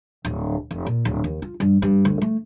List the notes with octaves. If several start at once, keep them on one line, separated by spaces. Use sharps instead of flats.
D1
F1
A#2
D1
D#2
F4
G2
G2
D2
A3